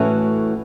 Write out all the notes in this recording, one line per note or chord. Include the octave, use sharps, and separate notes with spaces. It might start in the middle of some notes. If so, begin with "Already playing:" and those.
Already playing: A2 E3 A3 C#4 F#4